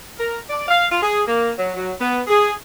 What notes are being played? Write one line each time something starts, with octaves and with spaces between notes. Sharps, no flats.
A#4
D5
F5
F4
G#4
A#3
F#3
F#3
B3
G#4